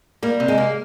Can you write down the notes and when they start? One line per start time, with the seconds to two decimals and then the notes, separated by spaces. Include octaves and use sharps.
0.22 G3 A#3
0.40 C3
0.48 G#3
0.58 A#3